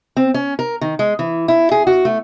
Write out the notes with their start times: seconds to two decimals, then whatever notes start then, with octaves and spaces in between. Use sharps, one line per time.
0.17 C4
0.34 C#4
0.59 A#4
0.81 D#3
0.99 G#3
1.19 E3
1.48 E4
1.71 G#4
1.87 F#4
2.05 A3